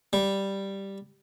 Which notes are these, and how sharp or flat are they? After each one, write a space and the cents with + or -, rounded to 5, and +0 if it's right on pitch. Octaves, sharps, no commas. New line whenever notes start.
G3 +0